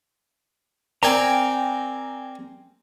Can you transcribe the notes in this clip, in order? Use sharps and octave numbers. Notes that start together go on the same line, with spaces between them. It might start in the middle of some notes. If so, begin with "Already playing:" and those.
C4 A#4 D5 G5 G#5 A#5